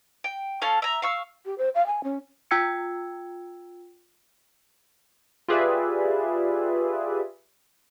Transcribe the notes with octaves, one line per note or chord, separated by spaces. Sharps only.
G5
C#4 A4 F5 A5
E5 A#5
F5 C#6 E6
G4
C5
F5
G#5
C#4
F4 G5 E6 G#6 C#7
F4 G4 G#4 B4 D5 E5